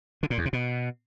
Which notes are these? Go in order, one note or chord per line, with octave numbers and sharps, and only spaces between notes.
D3
A#2
E2
C3
B2